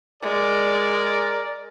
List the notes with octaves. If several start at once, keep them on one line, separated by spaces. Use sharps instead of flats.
G#3 A#4 D5